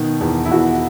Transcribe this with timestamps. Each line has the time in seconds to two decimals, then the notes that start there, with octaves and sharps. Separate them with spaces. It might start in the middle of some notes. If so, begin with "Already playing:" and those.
Already playing: B2 D#3
0.21 E2
0.45 E4
0.51 E2 F#4